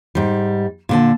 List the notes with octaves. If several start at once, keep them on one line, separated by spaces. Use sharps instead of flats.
G#2 G3
A#2 D3 A5